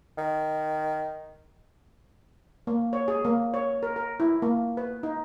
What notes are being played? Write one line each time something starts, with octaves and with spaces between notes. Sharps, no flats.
D#3
A#3
C#5
G#4
A#3
C#5
A#4
A#4
E4
A#3
B4
D#4